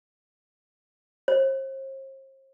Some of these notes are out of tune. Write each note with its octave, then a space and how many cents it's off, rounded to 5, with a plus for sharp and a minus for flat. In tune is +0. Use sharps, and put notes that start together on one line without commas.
C5 +40